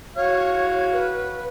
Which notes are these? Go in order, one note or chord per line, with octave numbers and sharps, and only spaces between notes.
F#4 C#5 F5
B4